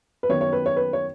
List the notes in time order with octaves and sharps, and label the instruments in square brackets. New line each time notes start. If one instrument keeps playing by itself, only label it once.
[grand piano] B4
F#2 D#3 B3 C#5
C#5
B4
C#5
B4
C#5